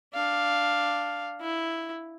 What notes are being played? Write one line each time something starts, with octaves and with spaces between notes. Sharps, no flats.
D4 F5
E4